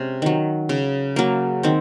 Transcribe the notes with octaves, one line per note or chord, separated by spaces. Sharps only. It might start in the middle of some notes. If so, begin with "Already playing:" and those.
Already playing: C3 G#3 C#4
D#3 F#3
C#3
F#3 A#3
D#3 C4